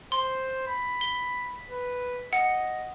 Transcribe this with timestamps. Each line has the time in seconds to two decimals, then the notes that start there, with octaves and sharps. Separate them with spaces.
0.12 C5 C6
0.67 B5
1.01 G7
1.70 B4
2.33 D#5 F#5 C#7